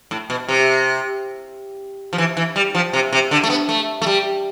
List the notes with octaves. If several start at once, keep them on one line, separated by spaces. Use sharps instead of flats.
A2
B2
C3
F3
E3
E3
G3
F3
C3
C3
D3
A3
B3
A3
A3
G3